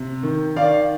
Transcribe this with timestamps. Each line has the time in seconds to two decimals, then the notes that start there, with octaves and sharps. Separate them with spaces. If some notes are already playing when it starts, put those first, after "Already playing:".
Already playing: C3
0.23 D#3
0.56 D#3 D5 F5